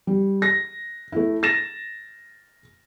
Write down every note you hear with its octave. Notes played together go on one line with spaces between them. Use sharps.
G3
A#6
A3 E4
A6 A#6 E7